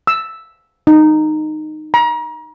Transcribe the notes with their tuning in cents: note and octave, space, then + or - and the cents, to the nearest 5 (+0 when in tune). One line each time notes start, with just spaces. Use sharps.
E6 +0
D#4 -15
A#5 +35